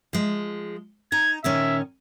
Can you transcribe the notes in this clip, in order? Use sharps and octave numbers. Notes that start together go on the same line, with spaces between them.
F3 G#3
D#4 A#5 G#6
A#2 D#3 C#4 E5